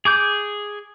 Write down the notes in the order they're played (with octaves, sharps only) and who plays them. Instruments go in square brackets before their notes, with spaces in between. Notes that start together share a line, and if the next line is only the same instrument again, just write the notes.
[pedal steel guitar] G#4 D6 G6